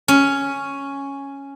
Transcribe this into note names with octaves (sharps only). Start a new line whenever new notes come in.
C#4